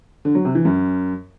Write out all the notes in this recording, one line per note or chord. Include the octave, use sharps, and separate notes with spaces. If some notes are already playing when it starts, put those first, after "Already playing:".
D3
F#3
C3
E3
F#2